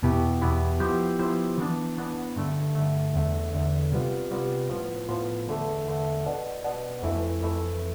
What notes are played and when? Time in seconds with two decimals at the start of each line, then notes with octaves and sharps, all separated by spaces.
0.02 E2 B2 B3 E4 G4
0.41 E2 B2 B3 E4 G4
0.80 F3 B3 E4 G4 C5
1.19 F3 B3 E4 G4 C5
1.58 E3 B3 D4
1.97 E3 B3 D4
2.36 G2 D3 A3
2.75 G2 D3 A3
3.14 E2 D3 A3
3.53 E2 D3 A3
3.92 C3 G3 B3 F4
4.31 C3 G3 B3 F4
4.69 A2 F3 B3 F4
5.08 A2 F3 B3 F4
5.47 E2 D3 A3
5.86 E2 D3 A3
6.25 B2 B3 D4
6.64 B2 B3 D4
7.03 F2 E3 A3 E4
7.42 F2 E3 A3 E4